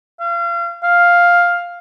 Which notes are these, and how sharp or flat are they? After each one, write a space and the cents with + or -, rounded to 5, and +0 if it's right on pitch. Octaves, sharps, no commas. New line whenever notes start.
F5 -35
F5 +5